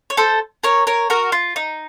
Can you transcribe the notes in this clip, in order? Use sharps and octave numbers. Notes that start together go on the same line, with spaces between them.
C#5
A4 C5
A#4 C#5
A#4 C#5
F#4 A#4
F4
D#4